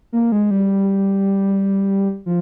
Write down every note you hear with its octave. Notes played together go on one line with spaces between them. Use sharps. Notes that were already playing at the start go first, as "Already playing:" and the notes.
A#3
G#3
G3
F3